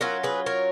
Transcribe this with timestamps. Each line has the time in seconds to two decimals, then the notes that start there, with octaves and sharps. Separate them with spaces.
0.01 F#3 C#4 F4 F#4 A#4
0.23 G#4 B4
0.46 A#4 C#5